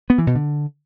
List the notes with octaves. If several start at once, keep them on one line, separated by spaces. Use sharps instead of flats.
B3
E3
B2
D3